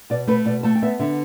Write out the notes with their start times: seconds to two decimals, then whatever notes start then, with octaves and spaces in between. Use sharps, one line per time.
0.10 B2 D5
0.27 A3 B4
0.45 B2 D5
0.63 A3 A5
0.75 G5
0.82 B3 E5
1.00 D3 E5